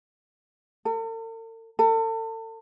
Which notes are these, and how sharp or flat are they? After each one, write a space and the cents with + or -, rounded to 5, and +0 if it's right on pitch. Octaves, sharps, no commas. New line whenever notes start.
A4 +45
A4 +35